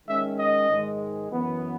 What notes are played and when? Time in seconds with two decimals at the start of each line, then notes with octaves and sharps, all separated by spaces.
0.08 D#3 G#3 C#4 E5
0.38 D#5
0.69 G#2 D#3 G#3
1.30 F#2 E3 B3